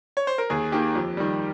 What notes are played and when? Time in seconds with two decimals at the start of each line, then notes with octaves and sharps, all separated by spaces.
0.17 C#5
0.27 C5
0.38 A#4
0.50 D#2 G#4
0.72 D#3 A#3 G4
0.95 F2
1.17 D#3 G3